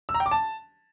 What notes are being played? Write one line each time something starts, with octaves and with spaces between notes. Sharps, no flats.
E6
A#5
G5
D6
A5